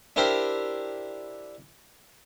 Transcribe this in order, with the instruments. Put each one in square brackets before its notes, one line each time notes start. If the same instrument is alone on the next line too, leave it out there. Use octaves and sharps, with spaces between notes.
[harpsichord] D4 E4 G4 A#4 C5